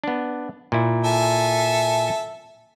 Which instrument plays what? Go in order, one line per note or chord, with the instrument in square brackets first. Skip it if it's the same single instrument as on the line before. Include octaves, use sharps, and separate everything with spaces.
[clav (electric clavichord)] B3 D4
A#2 E4
[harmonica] A4 E5 G#5